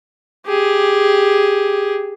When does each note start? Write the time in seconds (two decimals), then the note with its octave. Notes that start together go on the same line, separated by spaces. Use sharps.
0.46 G4 G#4